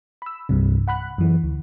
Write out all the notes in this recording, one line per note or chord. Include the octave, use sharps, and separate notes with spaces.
B5 E6
C2 G2 C3
F#5 B5 F#6
F#2 E3
D2